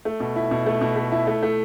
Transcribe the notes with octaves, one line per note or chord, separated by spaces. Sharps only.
A3
B2
E4
B2
A3
B2
A3
E4
A3
A3